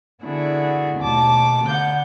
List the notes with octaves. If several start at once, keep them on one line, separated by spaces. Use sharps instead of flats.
D3 B3 D4 E4 F#4 G#4
D#2 B2 A3 A5 D6
D3 B3 F#5 G6